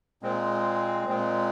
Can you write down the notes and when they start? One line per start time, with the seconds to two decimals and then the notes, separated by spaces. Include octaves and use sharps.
0.22 A#2 G#3 C4
1.07 A#2 G#3 C4